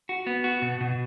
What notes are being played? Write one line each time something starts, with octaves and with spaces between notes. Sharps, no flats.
F#4
B3
F#4
B2
B2